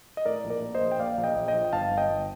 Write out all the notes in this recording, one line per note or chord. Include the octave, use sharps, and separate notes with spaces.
D#5
A2 A#4 D5
A#1
A#4 D5
A#3
C5 D#5
A#1
G5
A#3 D5 F5
A#1
D#5 G5
A#1
D#5 G5
F3
G5
G1 F5 A5
G1
D#5 G5
G1